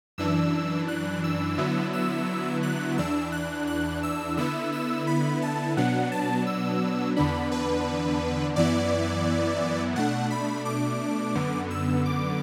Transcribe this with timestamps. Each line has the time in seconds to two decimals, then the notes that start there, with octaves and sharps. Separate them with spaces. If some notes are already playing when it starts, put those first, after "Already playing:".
0.18 F#2 E3 D4 E6
0.88 F#6
1.24 E6
1.58 D3 F#3 B3 E4
1.93 E6
2.63 F#6
2.98 E2 E3 D4 E6
3.32 F#6
3.67 F#6
4.03 E6
4.37 D3 B3 E4 E6
4.72 E6
5.07 B5
5.42 A5
5.77 B2 F#3 B3 D4 F#5
6.12 A5
6.47 E6
7.16 E2 D3 B3 D4 B5
7.52 B4
8.56 F#2 E3 B3 E4 D5
9.96 B2 A3 D4 F#5
10.30 B5
10.65 D6
11.35 F#2 D3 B3
11.70 E6
12.06 D6